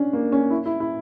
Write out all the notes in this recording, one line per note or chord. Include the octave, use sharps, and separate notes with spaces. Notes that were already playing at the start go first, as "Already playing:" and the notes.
Already playing: C#4 D4
A#3
C#4
E4
E4
E4